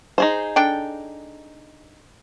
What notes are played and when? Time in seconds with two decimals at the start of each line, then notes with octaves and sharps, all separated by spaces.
0.18 D#4 G#4 C5
0.56 D4 A4 G5